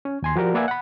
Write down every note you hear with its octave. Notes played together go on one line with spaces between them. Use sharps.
C#4
D#2 G#5 C6
F3 F#4 G4 A#4 D5
A#3 B4 D5 E5 F#5 G#5
F#5 B5